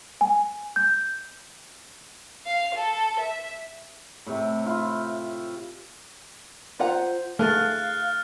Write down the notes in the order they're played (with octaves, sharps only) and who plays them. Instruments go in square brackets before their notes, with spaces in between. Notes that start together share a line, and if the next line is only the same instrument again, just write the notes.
[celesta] G#5
G6
[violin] F5
A4
E5
[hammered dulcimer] A2 C3
E4 F4
[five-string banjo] F4 F#5 A#5 [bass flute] C5
[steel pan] A3 [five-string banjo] G#4 A#4 A5 [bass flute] F5 [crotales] F6 F#6 A6